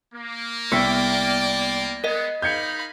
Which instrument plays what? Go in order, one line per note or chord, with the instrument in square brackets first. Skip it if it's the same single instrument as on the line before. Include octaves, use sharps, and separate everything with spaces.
[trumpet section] A#3
[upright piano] C2 [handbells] B3 B6 [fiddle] D5 G5
[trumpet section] G#3 B3 [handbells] A#4 D#5
[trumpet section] D#4 [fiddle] F5 B5 [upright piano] G6 G#6 C#7